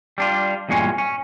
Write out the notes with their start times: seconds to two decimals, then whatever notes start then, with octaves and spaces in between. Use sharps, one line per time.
0.18 G3 D4 F4
0.69 E2 G2 A#2 G#3 C#4
0.98 C#4